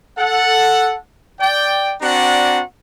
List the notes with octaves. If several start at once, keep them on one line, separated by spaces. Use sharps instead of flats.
A4 F#5
D5 G5
C4 D4 F#4 D5 F#5 A#5